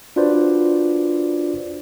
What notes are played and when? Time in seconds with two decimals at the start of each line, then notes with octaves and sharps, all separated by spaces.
0.16 D4 F4 F#4 B4 C5 D5